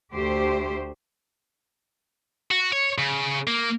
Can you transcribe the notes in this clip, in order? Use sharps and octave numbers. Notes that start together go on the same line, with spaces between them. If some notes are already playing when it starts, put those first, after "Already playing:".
D2 A3 G4 C5
F#4
C#5
C#3
A#3